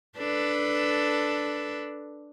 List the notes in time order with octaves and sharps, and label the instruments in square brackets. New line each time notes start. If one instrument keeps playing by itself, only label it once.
[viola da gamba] D4 A4 B4